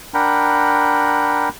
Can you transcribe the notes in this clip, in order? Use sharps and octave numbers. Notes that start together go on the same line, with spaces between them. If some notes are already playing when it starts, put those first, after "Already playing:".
D4 A#4 F#5 G5 A#5 B5